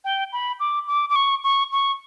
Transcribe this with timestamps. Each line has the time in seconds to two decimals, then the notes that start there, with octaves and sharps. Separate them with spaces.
0.04 G5
0.33 B5
0.60 D6
0.88 D6
1.10 D6
1.16 C#6
1.44 C#6
1.72 C#6